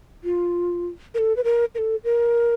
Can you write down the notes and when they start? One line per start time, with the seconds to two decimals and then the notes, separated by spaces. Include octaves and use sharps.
0.24 F4
1.14 A#4
1.18 A4
1.36 B4
1.44 A#4
1.75 A#4
1.78 A4
2.04 A#4